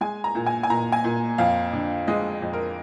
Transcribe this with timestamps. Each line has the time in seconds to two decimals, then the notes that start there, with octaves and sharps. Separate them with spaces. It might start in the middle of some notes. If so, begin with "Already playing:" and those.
0.01 G#3 G#5
0.24 A#5
0.35 A#2
0.46 G#5
0.63 G#5
0.70 A#2 A#5
0.92 G#5
1.04 A#2
1.38 F2 F5
1.73 D3
2.07 G#3 D#5
2.42 F2
2.53 A#4